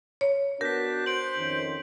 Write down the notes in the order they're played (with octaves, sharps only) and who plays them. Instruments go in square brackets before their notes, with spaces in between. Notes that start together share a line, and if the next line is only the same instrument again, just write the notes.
[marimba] C#5
[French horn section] B3 F#4 [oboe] D4 [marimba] A#4 [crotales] G6 B6
[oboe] C5 [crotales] D7 F#7
[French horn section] F2 D#3 C#4